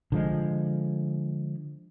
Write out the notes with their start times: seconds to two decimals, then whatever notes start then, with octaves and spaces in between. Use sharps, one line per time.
0.12 D3 F3 G#3